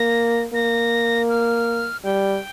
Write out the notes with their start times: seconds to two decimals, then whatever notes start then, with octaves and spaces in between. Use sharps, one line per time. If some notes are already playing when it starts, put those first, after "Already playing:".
Already playing: A#3 A#6
0.54 A#3 A#6
1.30 F6
2.04 G3 G5